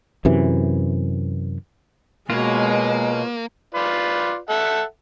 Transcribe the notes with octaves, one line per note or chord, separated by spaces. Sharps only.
F#2 C3 E3
B2 G#3 A#3 F4 B4 C#5
F4 B4 D5
A4 E5 F#5